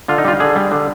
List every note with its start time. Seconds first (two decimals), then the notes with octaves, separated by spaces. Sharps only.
0.08 D3 F4
0.18 D#4
0.24 G3 F4
0.40 D3 G#4
0.56 G3
0.71 D3